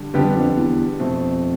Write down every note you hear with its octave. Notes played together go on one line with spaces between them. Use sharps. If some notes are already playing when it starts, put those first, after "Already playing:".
Already playing: D3 G3 D4
F2 D3 G3 B3 D4 G4
G2
F2
E2
F2 B2 A3 C4